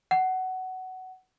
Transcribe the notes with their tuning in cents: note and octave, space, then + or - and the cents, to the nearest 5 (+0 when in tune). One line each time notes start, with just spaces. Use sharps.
F#5 +15